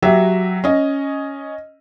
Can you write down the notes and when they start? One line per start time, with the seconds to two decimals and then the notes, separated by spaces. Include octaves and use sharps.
0.02 F#3 F#4 G4 E5
0.64 C#4 D#5